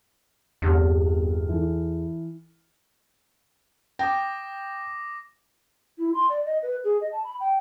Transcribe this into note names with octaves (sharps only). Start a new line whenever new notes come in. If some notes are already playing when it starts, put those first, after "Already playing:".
G1 E2 C3 F6
E3 E4 A4
G5 D6 D#6 A#6
E4
C6
D5
D#5
B4
G#4
D#5
A5
B5
G5